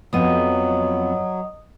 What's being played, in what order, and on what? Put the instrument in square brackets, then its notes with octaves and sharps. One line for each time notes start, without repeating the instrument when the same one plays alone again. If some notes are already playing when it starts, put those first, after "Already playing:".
[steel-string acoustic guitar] F2 B3 [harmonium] F#3 [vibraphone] D#5 D#6